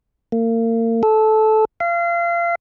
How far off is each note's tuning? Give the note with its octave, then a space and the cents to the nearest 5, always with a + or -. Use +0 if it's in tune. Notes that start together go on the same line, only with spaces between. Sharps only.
A#3 -35
A4 -15
F5 -30